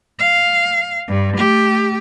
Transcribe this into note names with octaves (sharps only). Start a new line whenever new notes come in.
F5
G2
A3 G4